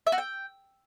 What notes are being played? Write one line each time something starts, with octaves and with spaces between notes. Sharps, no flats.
E5
F#4
G5